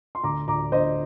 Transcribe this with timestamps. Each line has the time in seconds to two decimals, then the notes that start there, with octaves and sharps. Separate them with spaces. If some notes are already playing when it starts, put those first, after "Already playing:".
0.15 C6
0.23 D2 A#5 D6
0.48 D2 A#5 D6
0.72 D3 C5 D#5